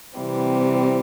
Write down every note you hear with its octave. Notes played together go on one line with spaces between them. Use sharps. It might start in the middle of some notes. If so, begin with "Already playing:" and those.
C3 E3 G3 C4